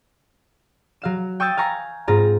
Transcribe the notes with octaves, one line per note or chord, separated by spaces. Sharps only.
F#3 F5 E7
G5 C#6 D#6 E6 G6 A6
F5 G#5 A#5 C#6
G#2 C4 F4 A#5